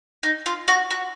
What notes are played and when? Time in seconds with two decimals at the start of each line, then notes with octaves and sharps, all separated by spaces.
0.23 D#4
0.46 F4
0.68 F#4
0.90 F#4